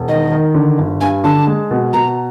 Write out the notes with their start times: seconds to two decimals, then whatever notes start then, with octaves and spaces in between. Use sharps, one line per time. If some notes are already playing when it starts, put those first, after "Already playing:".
Already playing: E1
0.08 D#3 D#5
0.31 D#3
0.54 D3
0.78 G1
1.01 G2 G#5
1.24 D3 A5
1.47 G#3
1.71 B2
1.93 B2 A#5